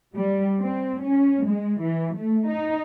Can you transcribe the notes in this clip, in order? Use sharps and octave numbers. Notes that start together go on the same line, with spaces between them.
G3
C4
C#4
G#3
E3
A3
D#4